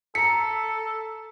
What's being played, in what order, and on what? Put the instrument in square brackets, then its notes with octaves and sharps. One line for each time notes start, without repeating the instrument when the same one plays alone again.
[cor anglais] A4 [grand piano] A#5 B6 [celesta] C#7